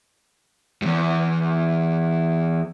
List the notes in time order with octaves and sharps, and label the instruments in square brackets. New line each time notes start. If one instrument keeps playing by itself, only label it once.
[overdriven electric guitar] E2 G2